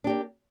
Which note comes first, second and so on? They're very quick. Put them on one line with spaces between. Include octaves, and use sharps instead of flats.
D4 G4 A#3